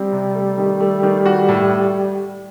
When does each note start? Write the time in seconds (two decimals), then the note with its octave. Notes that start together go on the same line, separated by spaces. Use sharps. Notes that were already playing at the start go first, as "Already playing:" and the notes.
Already playing: G3 C4
0.12 C3
0.35 A3
0.58 D#3
0.80 A3
1.03 D#3
1.26 F#4
1.49 A2